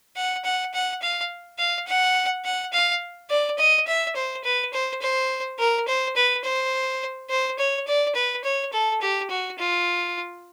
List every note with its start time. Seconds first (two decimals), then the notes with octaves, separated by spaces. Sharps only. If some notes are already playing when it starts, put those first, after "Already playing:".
0.16 F#5
0.44 F#5
0.73 F#5
1.02 F5
1.58 F5
1.87 F#5
2.45 F#5
2.73 F5
3.30 D5
3.58 D#5
3.87 E5
4.15 C5
4.44 B4
4.73 C5
5.01 C5
5.59 A#4
5.87 C5
6.16 B4
6.44 C5
7.30 C5
7.58 C#5
7.87 D5
8.15 B4
8.44 C#5
8.72 A4
9.01 G4
9.30 F#4
9.58 F4